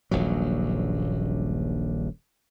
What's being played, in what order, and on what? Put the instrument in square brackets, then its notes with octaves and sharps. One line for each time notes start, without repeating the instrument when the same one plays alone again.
[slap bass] D#1 A#1 G2 F#3